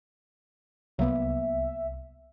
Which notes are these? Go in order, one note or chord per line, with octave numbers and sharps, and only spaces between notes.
C2 F#3 A#3 B3 E5